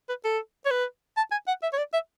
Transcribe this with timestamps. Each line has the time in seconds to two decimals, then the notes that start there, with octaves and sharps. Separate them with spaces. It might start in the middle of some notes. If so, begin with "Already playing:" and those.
0.09 B4
0.24 A4
0.66 C#5
0.71 B4
1.17 A5
1.31 G#5
1.48 F#5
1.63 E5
1.73 C#5
1.78 D5
1.93 E5